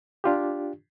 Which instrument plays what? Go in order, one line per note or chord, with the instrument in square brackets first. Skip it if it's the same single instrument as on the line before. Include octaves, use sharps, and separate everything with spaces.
[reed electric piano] D4 F4 G4